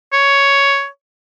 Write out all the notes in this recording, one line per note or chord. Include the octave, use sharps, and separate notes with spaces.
C#5